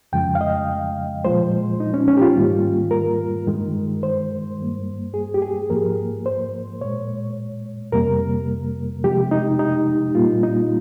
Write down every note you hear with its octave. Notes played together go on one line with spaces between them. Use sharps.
F2 C#3 F3 G#3 G5
F5
D#5
A#2 F3 G#3 C5
D#4
C#4
C#4
G4
F4
G#2 D#3 G3 A#3
A#4
G2 D#3 G#3
C5
G2 G3 A#3
G#4
G4
G#4
G#2 F3 A#3 A#4
C5
A#2 G#3 C#5
F2 C3 G3 A#3 A#4
C3 F3 G#3 G4
D#4
D#4
A#2 G3 A#3 F4
D#4